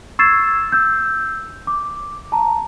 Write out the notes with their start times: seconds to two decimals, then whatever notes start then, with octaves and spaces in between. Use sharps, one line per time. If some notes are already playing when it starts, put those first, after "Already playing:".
0.19 C#6 E6 G#6 A6 C7 E7
0.72 E6 G6
1.67 D6
2.32 A5 A#5